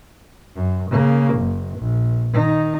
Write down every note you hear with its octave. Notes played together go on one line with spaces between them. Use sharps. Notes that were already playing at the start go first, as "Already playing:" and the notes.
F#2
C#3 A#3
F#1
A#1
D#3 D#4